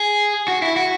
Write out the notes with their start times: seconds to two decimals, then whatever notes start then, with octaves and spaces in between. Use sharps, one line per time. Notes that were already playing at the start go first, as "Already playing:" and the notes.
Already playing: G#4
0.48 F#4
0.62 E4
0.76 F#4